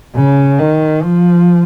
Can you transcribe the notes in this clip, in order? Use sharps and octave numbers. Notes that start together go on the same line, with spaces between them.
C#3
D#3
F3